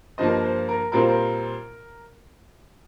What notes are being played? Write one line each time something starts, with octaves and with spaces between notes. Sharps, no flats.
G2 F3 A#3 C5 D#5
C5
A#4
A#2 G3 C4 F4 A#4
C5
A#4